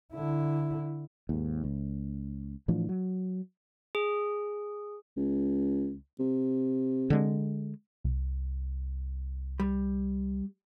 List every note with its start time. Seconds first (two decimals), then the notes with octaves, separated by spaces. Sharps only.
0.13 D3 E4
1.29 D#2 G#2
1.64 C#2
2.68 A2 E3 F3 D4
2.89 F#3
3.95 G#4
5.17 C#2
6.19 C3
7.10 D3 G#3
8.04 C2
9.60 G3